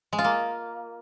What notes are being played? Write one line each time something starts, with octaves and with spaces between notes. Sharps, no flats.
G#3
F4
A#3